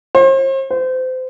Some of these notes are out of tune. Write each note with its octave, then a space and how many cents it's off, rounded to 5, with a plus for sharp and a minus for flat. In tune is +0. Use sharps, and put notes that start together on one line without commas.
C5 +40
C5 -30